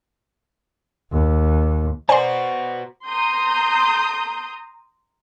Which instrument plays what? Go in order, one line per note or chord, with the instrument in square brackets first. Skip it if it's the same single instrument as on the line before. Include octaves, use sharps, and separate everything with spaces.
[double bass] D#2
[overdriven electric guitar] B3 F#4 [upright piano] C5 D5 A#5 [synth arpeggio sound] G#5 C6
[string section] A#5 C6 D#6 G6